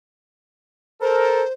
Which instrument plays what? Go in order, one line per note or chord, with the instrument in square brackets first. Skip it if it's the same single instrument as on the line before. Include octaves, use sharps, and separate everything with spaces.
[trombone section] A4 A#4 [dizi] C5